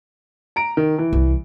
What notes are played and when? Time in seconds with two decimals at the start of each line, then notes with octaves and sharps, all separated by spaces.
0.56 A#5 D7
0.77 D#3
0.98 E3
1.13 C2